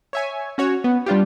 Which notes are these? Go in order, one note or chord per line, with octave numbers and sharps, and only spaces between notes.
C#5 E5 G#5
C#4 F#4 C#5
B3
G3 D4 F4 G4